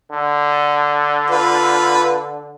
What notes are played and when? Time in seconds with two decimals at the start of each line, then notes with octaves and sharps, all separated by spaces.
0.11 D3
1.30 F4 B4